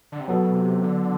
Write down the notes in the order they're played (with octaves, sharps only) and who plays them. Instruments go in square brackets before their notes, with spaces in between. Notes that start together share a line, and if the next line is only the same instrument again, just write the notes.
[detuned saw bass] D3
C3
[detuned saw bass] B2 [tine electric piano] F#3 B3 F#4 A4
[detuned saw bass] C3
D3